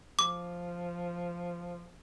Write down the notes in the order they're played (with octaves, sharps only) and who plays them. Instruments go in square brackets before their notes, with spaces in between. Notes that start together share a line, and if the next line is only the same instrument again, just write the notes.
[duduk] F3 [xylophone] D6